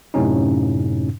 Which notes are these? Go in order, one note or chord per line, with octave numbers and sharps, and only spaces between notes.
F#2 A2 C3 C#4 D#4